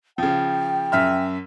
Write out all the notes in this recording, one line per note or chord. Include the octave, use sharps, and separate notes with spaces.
C#3 F3 G5
F#2 E5 F6